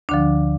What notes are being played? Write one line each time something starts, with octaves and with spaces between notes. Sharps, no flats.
D2 D3 F3 D4